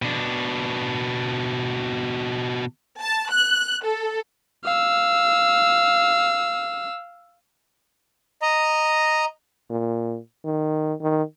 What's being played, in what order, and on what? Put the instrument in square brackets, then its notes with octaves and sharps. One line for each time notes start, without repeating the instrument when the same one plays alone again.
[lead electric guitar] B2 D4
[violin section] A5
F#6
A4
[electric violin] F5 E6
[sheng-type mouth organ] D#5 A#5
[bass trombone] A#2
D#3
D#3